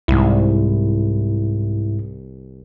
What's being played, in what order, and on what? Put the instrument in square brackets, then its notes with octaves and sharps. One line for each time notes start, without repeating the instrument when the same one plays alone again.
[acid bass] C2 [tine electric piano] G#2 E4